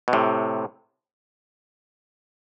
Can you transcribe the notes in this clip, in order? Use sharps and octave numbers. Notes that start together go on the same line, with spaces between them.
B2
A2 C3